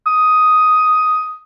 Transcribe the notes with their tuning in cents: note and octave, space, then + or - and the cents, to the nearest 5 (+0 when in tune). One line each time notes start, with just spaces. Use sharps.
D#6 +5